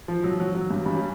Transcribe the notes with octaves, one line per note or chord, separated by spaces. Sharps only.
F3
F#3
F#3
F#3
G2 G3
G2 G3
C#4